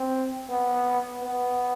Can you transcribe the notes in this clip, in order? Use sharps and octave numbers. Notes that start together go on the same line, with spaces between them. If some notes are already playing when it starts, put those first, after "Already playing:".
Already playing: C4
B3
B3